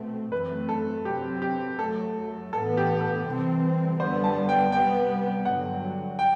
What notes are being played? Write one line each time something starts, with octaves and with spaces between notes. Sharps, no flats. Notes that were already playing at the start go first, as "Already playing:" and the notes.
Already playing: B2 A3 C4
F#2 E3 A3 C4 B4
A4
C3 F#3 C4 G4
G4
F#2 F#3 A3 A4
A2 E3 B3 A4
G4
A4
C3 E3 G3 C4
F#2 D3 G3 B3 C5
A5
G5
C3 G3 B3 G5
G2 D3 F#3 F#5
G5